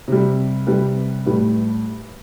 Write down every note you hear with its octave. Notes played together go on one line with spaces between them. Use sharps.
C3 G3
C3 G3 B4
A2 G3 B4